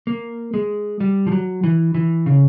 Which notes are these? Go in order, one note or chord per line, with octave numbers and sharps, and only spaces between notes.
A#3
G#3
G3
F3
F#3
E3
E3
C#3